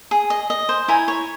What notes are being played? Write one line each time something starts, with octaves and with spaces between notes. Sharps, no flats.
G#4
D#5
D#5
C5
E4 G#5 A#5
C#5